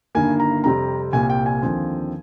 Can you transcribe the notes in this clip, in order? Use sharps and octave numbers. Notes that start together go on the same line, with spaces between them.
G1 G2 D#3 A#3 G#5
A#5
F2 C3 G3 C4 A#5
C2 A#2 G3 C4 G#5
G5
G#5
D#2 D3 F3 C4